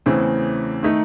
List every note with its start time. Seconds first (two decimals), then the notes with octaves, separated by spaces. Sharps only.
0.06 E2 C#3 E3 A3 C4
0.83 D#3 A3 D#4